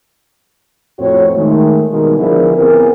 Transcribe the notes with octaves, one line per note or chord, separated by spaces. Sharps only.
F2 A2 C4 F#4 C#5
D#3 G#3 A3
B2 D#3 G3 G#3 A#3
D3 F3 B3 E4 G#4 A#4
B3 C4 E4 G#4 A#4